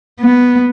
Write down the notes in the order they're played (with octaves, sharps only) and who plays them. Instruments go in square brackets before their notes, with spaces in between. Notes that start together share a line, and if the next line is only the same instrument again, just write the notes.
[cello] B3